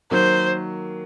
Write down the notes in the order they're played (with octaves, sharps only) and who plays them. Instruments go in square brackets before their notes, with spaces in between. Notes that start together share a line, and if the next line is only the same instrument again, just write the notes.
[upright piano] D#3 F#3 A#3 [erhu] C5